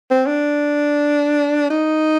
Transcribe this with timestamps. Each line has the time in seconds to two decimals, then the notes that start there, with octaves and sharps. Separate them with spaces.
0.10 C4
0.26 D4
1.70 D#4